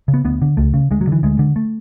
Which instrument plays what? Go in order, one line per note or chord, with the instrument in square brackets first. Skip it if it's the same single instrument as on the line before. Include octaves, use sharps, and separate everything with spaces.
[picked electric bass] C#3
B3
D2 B3
D3
C#2 A3
C#3
D2 G#3
F#3
D3 E3
D2 G#3
D3
A3